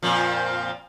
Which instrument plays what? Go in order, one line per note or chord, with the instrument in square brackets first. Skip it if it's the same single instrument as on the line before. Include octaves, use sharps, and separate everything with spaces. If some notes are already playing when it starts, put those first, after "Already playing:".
[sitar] F2 A#2 F3